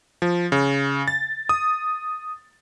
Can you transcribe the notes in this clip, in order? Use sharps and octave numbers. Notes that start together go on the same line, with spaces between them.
F3
C#3
A6
D#6